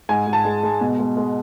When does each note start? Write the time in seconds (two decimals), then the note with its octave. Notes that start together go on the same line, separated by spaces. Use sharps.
0.09 G#2 G#5
0.27 G#2
0.33 A5
0.45 G#3
0.63 G#3
0.81 B2
0.99 G#3
1.17 G#3